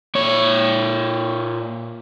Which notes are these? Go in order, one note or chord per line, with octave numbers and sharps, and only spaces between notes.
A#2 C#5